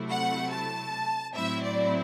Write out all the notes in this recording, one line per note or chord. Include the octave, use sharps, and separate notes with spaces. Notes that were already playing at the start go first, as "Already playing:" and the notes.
Already playing: C3 F#3 A3 E4
F#5
A5
A2 F#3 C4 E4 E5
D5